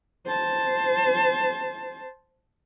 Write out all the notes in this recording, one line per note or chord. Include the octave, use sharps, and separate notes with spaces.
C5 A5